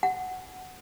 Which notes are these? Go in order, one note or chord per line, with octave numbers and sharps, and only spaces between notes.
F#5